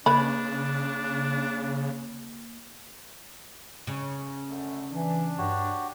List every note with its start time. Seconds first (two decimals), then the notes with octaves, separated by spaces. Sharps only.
0.06 C#3 A#3 D4 B4 C#5 B5
3.87 C#3
4.49 F#2 D3 A3
4.92 E3 D4
5.38 G2 F#4 G4 C#5